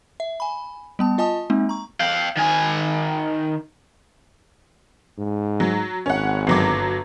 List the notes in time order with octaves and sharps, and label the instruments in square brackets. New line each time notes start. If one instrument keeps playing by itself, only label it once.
[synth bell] E5
G#5 B5
G3 B3 A5
F4 D#5 G#5 A5 D#6
G#3 A#3 C4 D#4
A#5 C#6
[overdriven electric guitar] F5 G5
D#3 G#5
[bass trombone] G#2
[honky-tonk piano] F#3
[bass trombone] G#1 [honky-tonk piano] C#4 F#5
[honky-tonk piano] G1 F#3 D6